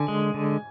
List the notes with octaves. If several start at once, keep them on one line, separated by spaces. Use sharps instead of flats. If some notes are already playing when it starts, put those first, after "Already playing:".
Already playing: D3 G#5
G#3
D3